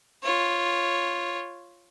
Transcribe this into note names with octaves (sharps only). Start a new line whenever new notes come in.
F4 C#5